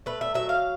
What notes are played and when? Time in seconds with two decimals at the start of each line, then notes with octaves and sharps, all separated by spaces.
0.06 A3 B4
0.21 E5
0.34 F#3 E5
0.49 F5